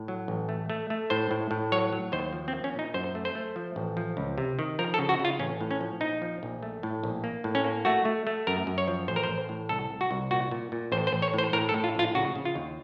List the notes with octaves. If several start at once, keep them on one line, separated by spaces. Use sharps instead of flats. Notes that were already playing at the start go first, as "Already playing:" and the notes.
Already playing: A2
F#3
A1
A3
A3
A3
A2 C5
A2
A2
F#3 C#5
F#3
D#2 C5
F3
C4
A#3
C#4
A#2 D#4
F#2 C5
A3
C5
A3
F3
A1
F3
C#2
C3
D#3
F3 A#4
A4
C#3
F#4
C#3
F4
A1 C#4
A2
C#4
F3
A#1 D#4
F3
A#1
A3
A2
A#1
A#3
A2
C#4
A#3
A3 F#4
A3
A3
F#2 A#4
F#2
C#5
F3
A1 C5
A#4
C5
A1
A2
C2 A4
C2
F#4
C2
A#2 F#4
A#2
A#2
A1 C5
C5
A1
C#5
A2 C5
A2 A#4
A4
A2
F4
A#1 F4
C#3 F#4
C#3
F4
D#2